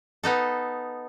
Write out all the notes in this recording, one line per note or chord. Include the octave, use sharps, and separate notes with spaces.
B3 D#4 A4